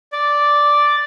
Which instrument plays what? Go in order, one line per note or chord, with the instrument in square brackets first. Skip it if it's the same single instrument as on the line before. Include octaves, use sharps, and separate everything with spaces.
[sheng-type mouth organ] D5